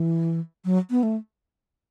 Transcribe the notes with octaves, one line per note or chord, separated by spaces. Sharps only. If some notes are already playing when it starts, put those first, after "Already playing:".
Already playing: E3
F#3
B3
A3